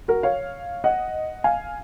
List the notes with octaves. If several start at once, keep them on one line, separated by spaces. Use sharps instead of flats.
F#4 A#4
C#5 F5
D#5 F#5
F5 G#5